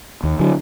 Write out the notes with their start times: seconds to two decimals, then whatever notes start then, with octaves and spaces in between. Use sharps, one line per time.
0.23 D#2
0.39 D3 F#3